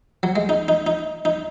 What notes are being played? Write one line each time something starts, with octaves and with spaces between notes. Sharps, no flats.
F#3
G#3
D#4
D#4
D#4
D#4